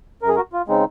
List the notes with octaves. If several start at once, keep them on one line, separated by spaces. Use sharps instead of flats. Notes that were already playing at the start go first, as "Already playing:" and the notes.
F#2 A#4
G#4
F#4 A#4
F4
C#3 G#3 C4 D#4